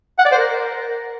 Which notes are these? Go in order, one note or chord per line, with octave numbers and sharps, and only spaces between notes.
F#5
D5
C5
A#4